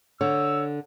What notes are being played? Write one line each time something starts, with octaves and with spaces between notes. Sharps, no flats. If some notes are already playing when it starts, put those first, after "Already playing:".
D3 C#5 E6